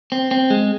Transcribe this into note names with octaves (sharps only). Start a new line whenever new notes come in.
C4
C4
G#3